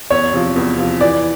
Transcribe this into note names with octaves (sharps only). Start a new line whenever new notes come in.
E2 C#5
C3 F3
E2
C3 F3
E3 D5